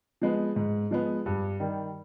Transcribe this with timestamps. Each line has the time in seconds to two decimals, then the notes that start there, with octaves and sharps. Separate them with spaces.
0.21 F3 G#3 B3
0.56 G#2
0.91 F3 G#3 B3
1.26 G2
1.60 D#3 G3